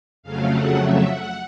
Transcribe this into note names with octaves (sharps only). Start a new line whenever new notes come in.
F2 C#3 F#3 A3 F5
F#5
E5
F#5